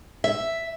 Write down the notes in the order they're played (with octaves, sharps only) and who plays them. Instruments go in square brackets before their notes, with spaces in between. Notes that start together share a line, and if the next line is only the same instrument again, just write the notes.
[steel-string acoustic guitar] E5